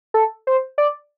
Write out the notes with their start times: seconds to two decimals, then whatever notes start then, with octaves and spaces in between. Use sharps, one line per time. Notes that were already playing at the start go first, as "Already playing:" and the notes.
0.14 A4
0.47 C5
0.78 D5